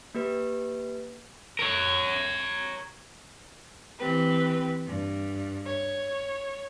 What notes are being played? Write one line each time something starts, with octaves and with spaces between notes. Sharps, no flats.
A#3 G4 B4
A#4 C#5
E3 C4 G4 B4
G2
C#5